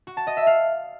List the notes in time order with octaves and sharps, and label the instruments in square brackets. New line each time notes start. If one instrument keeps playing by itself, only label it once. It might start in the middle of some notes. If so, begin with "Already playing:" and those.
[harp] F#4
A5
D#5
E5
F5